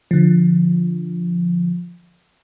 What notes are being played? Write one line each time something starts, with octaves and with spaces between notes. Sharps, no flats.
D3 F3